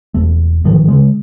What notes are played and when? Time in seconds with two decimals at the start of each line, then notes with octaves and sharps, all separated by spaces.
0.14 E1 A3
0.64 A1 G#2 D#3 F3
0.88 C#3 G#3